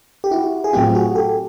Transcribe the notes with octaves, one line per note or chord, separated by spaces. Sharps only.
G4
E4 F#4
G#4
A2 F#3 A3 C4 F4 G4
F#4 G#4
G4 A4